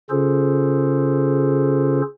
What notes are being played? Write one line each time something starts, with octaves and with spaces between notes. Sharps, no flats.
C#3 C#4 F4 G#4 A4 C5